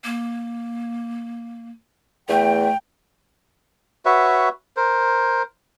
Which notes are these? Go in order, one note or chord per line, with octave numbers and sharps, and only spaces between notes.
A#3
E2 A3 G5
F#4 B4 C#5 E5
A#4 C5